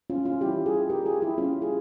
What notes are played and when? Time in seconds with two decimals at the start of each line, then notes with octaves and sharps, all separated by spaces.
0.10 C#4 F4
0.25 C#4 F4
0.41 E3 G3 C#4 E4 G4
0.66 F4 G#4
0.90 G4 A#4
1.06 F4 G#4
1.21 E4 G4
1.37 G3 A#3 C#4 F4
1.62 F4 G#4